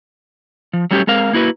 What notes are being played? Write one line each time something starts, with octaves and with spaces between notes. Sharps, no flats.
F3
F#3 G3 A3 C#4 E4 G4
G#3 C4 A#4 F5
A#3 E4 F#4 B4